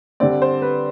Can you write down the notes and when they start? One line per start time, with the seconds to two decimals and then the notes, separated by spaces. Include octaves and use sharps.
0.20 D3 G3 C4 D5
0.42 C5
0.62 B4